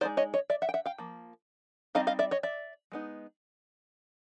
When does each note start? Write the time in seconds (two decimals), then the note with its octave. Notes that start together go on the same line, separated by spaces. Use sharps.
0.01 G#3 B3 D#4 C5 D5
0.17 C#5 D#5
0.34 C#5 D#5
0.50 D5 E5
0.62 E5 F#5
0.69 G5
0.74 E5 F#5
0.86 F5 G5
0.98 F3 A#3
1.95 G3 C4 D#4 D#5 F5
2.07 D#5 F5
2.19 D5 E5
2.31 C#5 D#5
2.43 D5 E5
2.92 G#3 B3 D#4